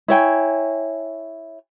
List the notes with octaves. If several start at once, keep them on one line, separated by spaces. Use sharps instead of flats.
E4 C#5 G5 G#5